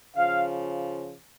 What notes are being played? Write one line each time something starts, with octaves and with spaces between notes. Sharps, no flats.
C#3 F3 F5